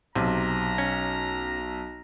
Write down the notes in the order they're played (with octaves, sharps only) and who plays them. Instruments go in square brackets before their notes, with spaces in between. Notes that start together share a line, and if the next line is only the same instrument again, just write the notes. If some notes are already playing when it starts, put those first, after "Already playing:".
[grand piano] B1 [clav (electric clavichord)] C3 [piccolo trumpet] A#5
[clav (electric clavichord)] C#4